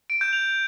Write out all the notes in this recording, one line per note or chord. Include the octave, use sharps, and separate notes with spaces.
D7
G6
F7